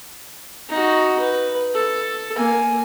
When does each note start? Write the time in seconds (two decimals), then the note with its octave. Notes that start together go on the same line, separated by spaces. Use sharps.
0.70 D#4 F#4
1.20 B4
1.74 A4
2.36 A#3 G#5